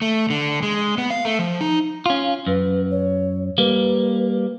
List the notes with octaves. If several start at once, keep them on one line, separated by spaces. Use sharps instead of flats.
A3
D3
G#3
B3
F5
A3
F3
D#4
C#4 F4 F5
F#2 B4
C#5
G3 A#3 B4